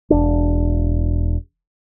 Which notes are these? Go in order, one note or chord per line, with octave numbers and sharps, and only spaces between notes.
E1 D4